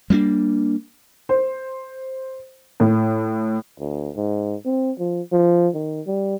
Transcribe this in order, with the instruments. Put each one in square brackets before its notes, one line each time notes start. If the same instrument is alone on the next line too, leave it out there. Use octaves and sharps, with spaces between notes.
[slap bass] G3 A#3 C4 D4
[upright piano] C5
A2
[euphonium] D2
G#2
C4
F3
F3
D#3
G3